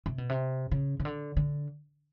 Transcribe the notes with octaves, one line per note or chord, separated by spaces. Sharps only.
C3
B2
C3
C#3
C#3
D3
D3